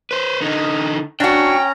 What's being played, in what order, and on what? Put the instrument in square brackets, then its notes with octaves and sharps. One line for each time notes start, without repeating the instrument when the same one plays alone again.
[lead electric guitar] B4 C5
D3 D#4
[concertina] C#4 A#5 [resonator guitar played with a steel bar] D4 F#4 [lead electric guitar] G5